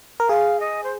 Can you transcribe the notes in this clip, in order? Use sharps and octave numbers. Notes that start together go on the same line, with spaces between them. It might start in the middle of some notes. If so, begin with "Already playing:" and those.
A#4
G#4 F5
D#5
C5